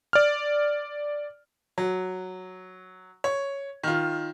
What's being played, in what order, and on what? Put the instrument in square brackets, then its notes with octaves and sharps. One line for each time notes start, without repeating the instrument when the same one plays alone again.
[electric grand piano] D5 F6
[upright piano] F#3
C#5
D#3 F4